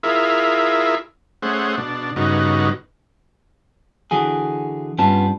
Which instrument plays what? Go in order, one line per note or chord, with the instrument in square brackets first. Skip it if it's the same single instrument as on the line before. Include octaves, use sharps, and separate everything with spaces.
[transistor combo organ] E4 F4 G#4 A#4 E5
A3 C#4 G#4 C5 F#5
B2 D4
G2 C#3 B3 D#4 F#4
[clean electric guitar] D3 E3 F#4 G#4
G2 G3 B3 C#4 F4 A5